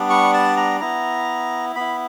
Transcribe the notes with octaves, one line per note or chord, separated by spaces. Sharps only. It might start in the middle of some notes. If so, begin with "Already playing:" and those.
Already playing: G3 B3 D4
C#6
A5
A#5
B3 E4 A#5
B3 E4 B5